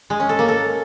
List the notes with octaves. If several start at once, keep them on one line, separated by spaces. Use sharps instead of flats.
G#3
C#4
A4
A#3
A4